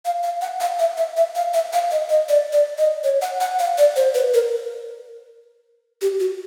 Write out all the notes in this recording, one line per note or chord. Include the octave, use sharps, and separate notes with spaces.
F5
F5
F#5
F5
E5
E5
E5
F5
E5
F5
D#5
D#5
D5
D5
D#5
C#5
F#5
F#5
F5
D5
C5
B4
A#4
G4
F#4